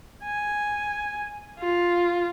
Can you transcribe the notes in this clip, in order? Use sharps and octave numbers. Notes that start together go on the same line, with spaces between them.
G#5
F4